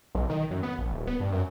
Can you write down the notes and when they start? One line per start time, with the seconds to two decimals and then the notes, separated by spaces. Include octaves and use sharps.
0.15 B1
0.29 D#3
0.50 F#2
0.63 B3
0.79 A#1
0.92 D#1
1.07 B3
1.20 G2
1.32 F#2